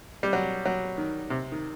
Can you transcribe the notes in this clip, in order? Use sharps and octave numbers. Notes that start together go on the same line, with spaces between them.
G3
F#3
F#3
D#3
C3
D#3